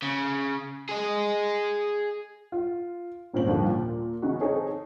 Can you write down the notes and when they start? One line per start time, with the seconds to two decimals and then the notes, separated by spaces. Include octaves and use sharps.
0.02 C#3
0.89 G#4 D#5
2.52 F4
3.33 G#1 A#2 C#4 C5 F#7
3.47 D#2 D3 F3 G3
3.66 A#2
4.22 C#3 E3 B3 D#4 F#4
4.40 C4 D#4 G#4 A4 C#5